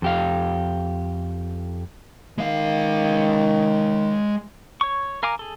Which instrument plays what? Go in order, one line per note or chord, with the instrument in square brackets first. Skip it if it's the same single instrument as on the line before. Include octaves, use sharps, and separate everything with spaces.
[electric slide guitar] F2 G4 F5
[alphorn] D#3 [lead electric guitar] G#3 F5
[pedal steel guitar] C#5 C#6
A#4 F5 G#5 A#5 D6
G#4 A4